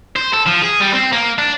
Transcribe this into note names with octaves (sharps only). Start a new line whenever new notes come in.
C5
A4
F3
G#4
G3
C4
A#3
D4